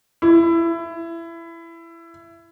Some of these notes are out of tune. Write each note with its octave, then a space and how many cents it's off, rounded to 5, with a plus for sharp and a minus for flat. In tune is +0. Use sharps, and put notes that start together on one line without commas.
E4 +20